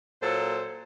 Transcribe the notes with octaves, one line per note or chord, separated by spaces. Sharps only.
A#2 F#3 A4 C5